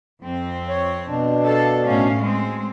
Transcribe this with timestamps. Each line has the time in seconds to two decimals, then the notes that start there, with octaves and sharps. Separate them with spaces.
0.24 F2 C4
0.69 C#5
1.08 B2 D4
1.46 A4 F5
1.86 A2 C#4 F5
2.21 G#3 C4